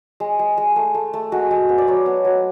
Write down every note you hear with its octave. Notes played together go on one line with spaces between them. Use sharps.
G#3
G#3
G#3
A3
A3
A3
G#3 F#4
G#3
B3
D5
F#3 C#5
B3
F#3